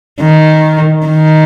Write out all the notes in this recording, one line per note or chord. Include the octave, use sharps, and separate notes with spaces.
D#3
D#3